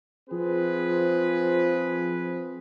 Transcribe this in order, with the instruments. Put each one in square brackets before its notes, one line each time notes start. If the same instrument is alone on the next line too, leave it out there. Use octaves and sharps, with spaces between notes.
[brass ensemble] F3 C4 G#4 B4